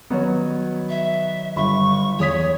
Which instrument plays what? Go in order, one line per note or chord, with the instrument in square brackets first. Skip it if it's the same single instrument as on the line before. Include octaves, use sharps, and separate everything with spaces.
[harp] D#3 F#3 [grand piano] B3 F#4 C#5
[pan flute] E5
[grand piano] G1 B5 [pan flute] C#6
[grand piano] E2 D#6 B6 [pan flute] C#5